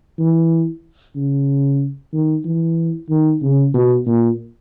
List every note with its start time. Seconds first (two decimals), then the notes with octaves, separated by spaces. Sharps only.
0.19 E3
1.16 C#3
2.13 D#3
2.45 E3
3.10 D#3
3.42 C#3
3.74 B2
4.06 A#2